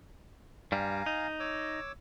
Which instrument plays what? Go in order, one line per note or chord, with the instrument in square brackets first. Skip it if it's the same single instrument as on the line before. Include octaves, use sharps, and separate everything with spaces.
[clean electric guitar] G2 G3 [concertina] F5 G#5 A#5
[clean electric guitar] D#4
[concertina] C#5 D6 E6